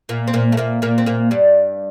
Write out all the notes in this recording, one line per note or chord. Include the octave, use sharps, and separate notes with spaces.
A#2 A#3
C4
A#2 A#3
A3
A#2 A#3
A#2 A#3
C4
A#2 A#3
G2 G3